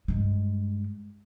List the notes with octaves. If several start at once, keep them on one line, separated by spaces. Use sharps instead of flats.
G2 G#3